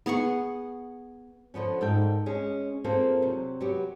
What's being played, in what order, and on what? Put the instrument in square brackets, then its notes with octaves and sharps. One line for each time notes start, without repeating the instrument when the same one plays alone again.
[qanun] B3 G#4 F#5 C#6
[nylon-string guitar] D3 F3 B3 C#4
G#2 A4 A#4 G5
G#3 C#4 G#4
A#3 C4 F4 G#4 A4
C3 F#3
F#3 B3 F#4 G4